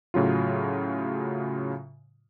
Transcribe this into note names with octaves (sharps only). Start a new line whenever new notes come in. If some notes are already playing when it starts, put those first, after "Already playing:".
A2 C#3 F#3 F4